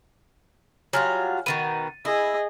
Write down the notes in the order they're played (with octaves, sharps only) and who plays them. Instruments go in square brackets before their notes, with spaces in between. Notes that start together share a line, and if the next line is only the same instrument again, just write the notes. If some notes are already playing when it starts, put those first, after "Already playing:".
[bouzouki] F#3 G3 F4 [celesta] C#5 G#5 F6
[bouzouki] B2 D#3 B3 [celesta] A6 D#7
[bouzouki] E4 [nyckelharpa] G#4 D#5